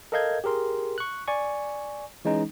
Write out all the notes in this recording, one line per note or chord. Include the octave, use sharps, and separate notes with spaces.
A4 A#4 D#5 F5 G6 G#6
G4 G#4 A#4 C6
C#6 F#6
D5 G#5 C#6
E3 G#3 C#4 D#4